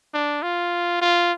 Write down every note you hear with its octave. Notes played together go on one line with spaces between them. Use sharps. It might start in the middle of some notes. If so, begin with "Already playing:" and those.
D4
F4
F4